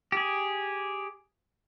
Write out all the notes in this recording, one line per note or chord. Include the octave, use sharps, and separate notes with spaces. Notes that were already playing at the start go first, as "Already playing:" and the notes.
G4 G#4